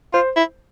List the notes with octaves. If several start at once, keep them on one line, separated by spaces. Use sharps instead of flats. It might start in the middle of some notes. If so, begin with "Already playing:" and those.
F4 C5
E4